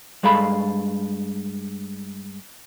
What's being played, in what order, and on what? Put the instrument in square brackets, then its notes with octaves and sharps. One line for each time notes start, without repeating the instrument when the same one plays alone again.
[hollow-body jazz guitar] G2 G#3 A4 F5 B5